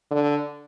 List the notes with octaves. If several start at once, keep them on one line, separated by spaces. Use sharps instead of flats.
D3